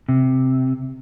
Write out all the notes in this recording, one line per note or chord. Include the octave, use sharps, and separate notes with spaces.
C3